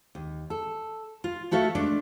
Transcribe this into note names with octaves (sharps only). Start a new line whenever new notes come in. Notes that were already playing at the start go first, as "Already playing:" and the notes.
D#2
A4
F4
A3 F#4 A4 E5 F5
G#3 A3 D4